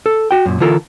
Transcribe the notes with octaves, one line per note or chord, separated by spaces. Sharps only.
A4
F#4 G5
F#2 A#2
D3 E3 F4 A4 A#4